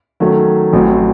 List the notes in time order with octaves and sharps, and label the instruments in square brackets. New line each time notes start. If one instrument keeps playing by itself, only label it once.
[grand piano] D#3 F#3 A3 C#4 A4
A1 A2 F#3 C4